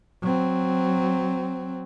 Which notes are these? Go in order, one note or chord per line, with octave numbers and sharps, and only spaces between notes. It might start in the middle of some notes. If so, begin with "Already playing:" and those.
F#3 C4